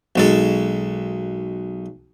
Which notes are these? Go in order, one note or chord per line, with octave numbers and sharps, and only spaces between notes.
B1 G#3 A4